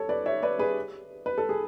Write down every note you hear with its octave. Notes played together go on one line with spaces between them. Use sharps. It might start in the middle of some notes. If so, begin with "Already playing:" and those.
Already playing: A4 C#5
B4 D5
C#5 E5
B4 D5
G#4 B4
B4
A4
G#4